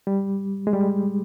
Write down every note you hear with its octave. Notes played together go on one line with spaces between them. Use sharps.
G3
G#3
G3